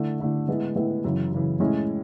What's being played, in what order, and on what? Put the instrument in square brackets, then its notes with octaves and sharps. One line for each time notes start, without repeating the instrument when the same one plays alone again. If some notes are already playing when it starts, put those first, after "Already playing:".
Already playing: [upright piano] D3 A3 E4
D3 A3 E4
A2 G#3 B3 E4
A2 G#3 B3 E4
F#2 C#3 E3
F#2 C#3 E3
A2 G#3 C#4 E4